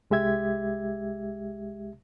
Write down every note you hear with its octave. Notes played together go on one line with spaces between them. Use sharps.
C2 G#3 G4 E5 G#6